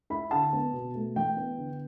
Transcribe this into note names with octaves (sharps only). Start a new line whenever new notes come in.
E4 B5
D3 A5
B3
B2
A3
E3 G5
B3
D3